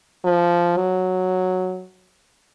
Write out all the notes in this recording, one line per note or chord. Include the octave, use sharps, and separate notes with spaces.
F3
F#3